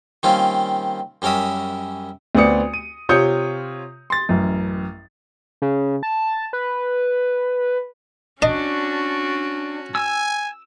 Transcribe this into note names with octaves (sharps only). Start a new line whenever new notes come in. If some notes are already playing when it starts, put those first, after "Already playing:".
D#3 G3 A#3 C4 C#4 F4
F#2 G3 C#4 A#4 E5 D#6
D2 B3 C4 D5 D#6 C#7
D#7
C3 F4 C#5 D#6 G6 C#7
C6 A6
A1 F#2
C#3
A5
B4
C#4 D4 F#4 D#5
G#5 E6